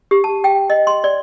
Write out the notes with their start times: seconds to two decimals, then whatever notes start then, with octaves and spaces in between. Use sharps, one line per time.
0.11 G4
0.24 A5
0.44 G5
0.70 D#5
0.87 C6
1.04 D5